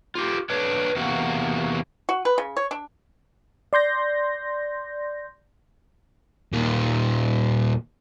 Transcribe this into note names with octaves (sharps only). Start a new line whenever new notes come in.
F4 G4
D4 B4 C#5
E2 C3 A#3 F#4
F#4
B4
C#3
C#5
D4
D5 C6 G6 A#6
D#2 A#2